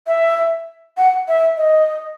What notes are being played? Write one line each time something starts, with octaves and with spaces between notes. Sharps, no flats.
E5
F#5
E5
D#5